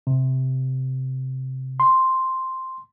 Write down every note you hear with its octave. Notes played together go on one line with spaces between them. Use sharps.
C3
C6